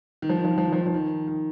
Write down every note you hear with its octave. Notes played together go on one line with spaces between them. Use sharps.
D#3
F3
D#3
F3
D#3
F3
D#3
F3
D#3
F3
D#3
D#3